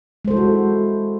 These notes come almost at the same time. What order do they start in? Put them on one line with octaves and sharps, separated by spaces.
G#3 C5 A4 E4 F#4